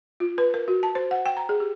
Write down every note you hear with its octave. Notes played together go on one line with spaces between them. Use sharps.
F4
B4
A#4
F#4
A5
C5
F#5
G5
A#5
G#4
G4